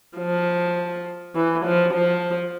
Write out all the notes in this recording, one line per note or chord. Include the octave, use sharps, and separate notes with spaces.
F3
E3
F3
F3